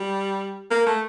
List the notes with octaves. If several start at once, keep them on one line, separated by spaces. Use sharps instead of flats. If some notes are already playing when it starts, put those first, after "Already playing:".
Already playing: G3
A#3
A3